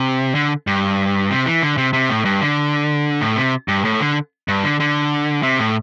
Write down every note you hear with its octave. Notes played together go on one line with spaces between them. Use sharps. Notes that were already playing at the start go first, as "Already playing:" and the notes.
Already playing: C3
D3
G2
C3
E3
D3
C3
C3
A2
G2
D3
A2
C3
G2
A2
D3
G2
D3
D3
C3
A2